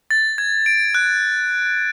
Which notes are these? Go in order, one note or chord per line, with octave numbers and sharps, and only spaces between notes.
A6
G#6
D7
F#6